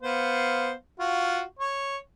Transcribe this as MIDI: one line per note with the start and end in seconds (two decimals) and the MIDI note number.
0.02 0.72 59
0.02 0.72 72
0.02 0.72 77
0.99 1.41 65
0.99 1.41 66
1.59 1.96 73